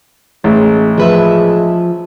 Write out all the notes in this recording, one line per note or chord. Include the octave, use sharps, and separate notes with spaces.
A1 G#3
F3 G#3 B4 E5